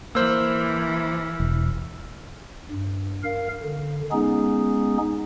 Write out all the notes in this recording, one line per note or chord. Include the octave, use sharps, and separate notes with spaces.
E3 A#3 C5 E6 F6 F#7
E1
G2
A#4 F5
D3
G#3 B3 C#4 D#4 G#4